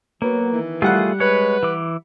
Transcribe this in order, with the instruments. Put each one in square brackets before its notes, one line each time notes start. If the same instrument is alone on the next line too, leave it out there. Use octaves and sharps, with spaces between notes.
[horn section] F#3 [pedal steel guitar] A#3 [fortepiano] B3
[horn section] D#3 E3
[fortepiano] G3 F#5 F#6 [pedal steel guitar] A3 F4 G#4
[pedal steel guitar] G#3 C#5 [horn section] B4
[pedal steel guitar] E3 D6